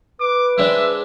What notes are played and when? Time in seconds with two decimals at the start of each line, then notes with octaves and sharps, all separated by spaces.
0.20 B4 D6
0.58 G#3 C4 D4 E5